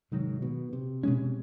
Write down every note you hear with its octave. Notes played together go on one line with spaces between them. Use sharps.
G#2 C3 D#3 F#3
B2
C3
B2 G#3 C#4